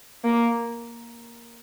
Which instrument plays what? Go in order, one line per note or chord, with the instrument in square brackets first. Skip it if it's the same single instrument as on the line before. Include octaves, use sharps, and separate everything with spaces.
[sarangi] A#3